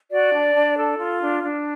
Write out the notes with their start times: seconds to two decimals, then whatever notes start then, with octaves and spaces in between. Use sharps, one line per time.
0.10 F#4 D5
0.32 D4
0.54 D4
0.76 A4
0.98 F4
1.20 D4
1.42 D4